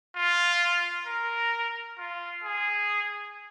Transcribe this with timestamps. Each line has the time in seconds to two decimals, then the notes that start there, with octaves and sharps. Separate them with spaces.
0.16 F4
1.07 A#4
1.99 F4
2.44 G#4